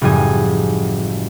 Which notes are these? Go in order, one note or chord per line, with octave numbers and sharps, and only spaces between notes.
F#1 A2 F3 G3 G#5 D#6